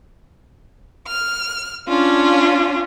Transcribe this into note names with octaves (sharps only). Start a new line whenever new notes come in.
F6
C#4 D4 F4